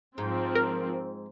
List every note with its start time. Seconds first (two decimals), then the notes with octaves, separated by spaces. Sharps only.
0.18 G#2 F3 C4
0.55 A#4